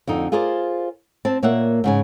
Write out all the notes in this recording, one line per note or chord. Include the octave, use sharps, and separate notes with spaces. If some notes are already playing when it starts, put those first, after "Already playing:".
F2 D3 D#4
F4 G#4 A#4 C5 D5
C4 A5
A#2 A#3 C#5 E5 F#5
G#2 C#3 G#5